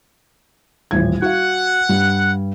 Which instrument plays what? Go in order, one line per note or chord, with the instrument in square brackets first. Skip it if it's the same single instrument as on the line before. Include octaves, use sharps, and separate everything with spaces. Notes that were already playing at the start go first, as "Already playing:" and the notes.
[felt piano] D#1 A1 G#6
[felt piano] F#4 F5 [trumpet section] F#5
[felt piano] G2 G3